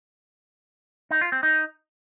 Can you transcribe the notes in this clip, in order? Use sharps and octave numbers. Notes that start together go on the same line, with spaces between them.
D#4
F4
C4
D#4